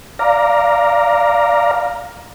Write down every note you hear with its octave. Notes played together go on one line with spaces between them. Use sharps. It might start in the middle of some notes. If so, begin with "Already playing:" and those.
D5 F5 A#5